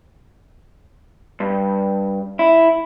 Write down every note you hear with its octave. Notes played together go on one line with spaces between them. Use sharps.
G2
E4